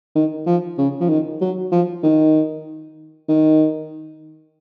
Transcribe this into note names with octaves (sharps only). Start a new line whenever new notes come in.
D#3
F3
C#3
F3
D#3
F#3
F3
D#3
D#3